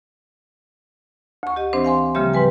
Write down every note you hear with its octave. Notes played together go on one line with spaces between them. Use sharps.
D2 C#6
G4 D#5
E3 C4 D4 C5
F5 G#5 C6
C#3 F3 G3 A#3 G4 E5
G#2 G3 B4 G#5